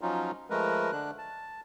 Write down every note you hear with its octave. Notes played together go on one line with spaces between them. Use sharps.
F3 F#3 C#4 D#4 F4
F3 G#3 A3 A#4 B4
D3 D4 F#6
A5